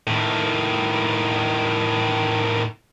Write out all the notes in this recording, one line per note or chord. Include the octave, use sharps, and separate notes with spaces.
A2 D#3